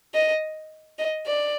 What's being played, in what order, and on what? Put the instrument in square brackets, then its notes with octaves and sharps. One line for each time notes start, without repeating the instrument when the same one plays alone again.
[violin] D#5
D#5
D5